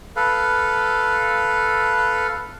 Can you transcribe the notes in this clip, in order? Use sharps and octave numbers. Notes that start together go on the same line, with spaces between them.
A4 B4 F5